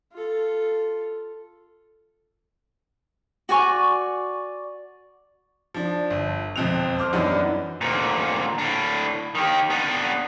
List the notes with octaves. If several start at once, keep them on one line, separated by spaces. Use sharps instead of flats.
F4 A4
F#4 D5 G#5 C#6
F3 D4
G1
E1 F2 F3 C4 F#6 F7
C5 D6 F6
F#2 E3 G3 B3 D4 D#4
D2 A#2
A2 D4
D#3 G4
B3 D4